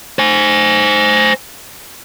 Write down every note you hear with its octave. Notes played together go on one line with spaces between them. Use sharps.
C5 G#5